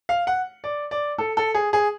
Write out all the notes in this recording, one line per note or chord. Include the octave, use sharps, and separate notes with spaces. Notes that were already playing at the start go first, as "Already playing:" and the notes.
F5
F#5
D5
D5
A4
A4
G#4
G#4